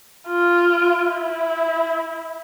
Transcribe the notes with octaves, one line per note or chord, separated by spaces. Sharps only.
F4
E4